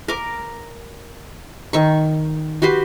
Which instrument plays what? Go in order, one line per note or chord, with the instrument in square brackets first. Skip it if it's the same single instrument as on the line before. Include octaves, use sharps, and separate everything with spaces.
[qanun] A#4 D6
D#3 C#6
F#4 G4 B4 C6